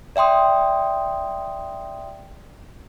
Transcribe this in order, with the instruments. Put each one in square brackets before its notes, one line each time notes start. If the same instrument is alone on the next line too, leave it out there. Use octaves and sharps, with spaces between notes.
[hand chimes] D5 E5 G5 C6 D#6